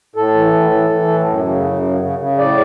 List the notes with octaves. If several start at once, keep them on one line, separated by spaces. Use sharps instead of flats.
A2 A4
E3
A2
E3
E3
A2
F#2
C#3
F#2
C#3
C#3
C#3
A2 D5